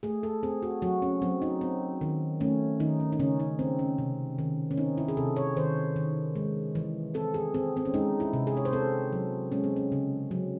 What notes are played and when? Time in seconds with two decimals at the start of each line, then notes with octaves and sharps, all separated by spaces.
0.03 A3 G#4
0.23 A4
0.43 C4 G#4
0.63 F#4
0.82 F#3 F#4
1.02 C#4
1.22 F#3 C4
1.42 D#4
1.61 C4
2.01 D#3
2.41 A3 C#4
2.80 D#3 D#4
3.00 C#4
3.12 D#4
3.19 C#3 C#4
3.40 D#4
3.59 C4
3.79 C#4
3.98 C3
4.38 D#3
4.71 C#4
4.78 C4 D#4
4.98 E4
5.08 G#4
5.17 C3 A4
5.36 C#5
5.57 D#3 C5
5.96 D#3
6.36 G#3
6.75 E3
7.14 C4 A4
7.34 G#4
7.54 C4 G#4
7.77 C4
7.85 C#4
7.94 G#3 D#4
8.20 E4
8.33 C3
8.47 G#4
8.57 C#5
8.65 C5
8.73 C4 A4
9.13 F#3
9.52 G#3 C#4
9.64 C4
9.76 C#4
9.92 C#3
10.31 F#3